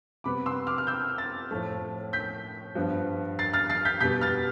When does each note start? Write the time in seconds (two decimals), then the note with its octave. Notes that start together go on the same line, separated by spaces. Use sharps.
0.24 C3 G3 B3 B5 D6
0.46 C6 E6
0.67 D6 F6
0.78 F6
0.87 E6 G6
1.18 F6 A6
1.51 A2 F3 A3
2.13 G6 B6
2.75 G2 F3 B3
3.39 A6 C7
3.53 F6 A6
3.70 A6 C7
3.85 G6 B6
4.01 B2 G3 B3 G6 B6
4.21 F6 A6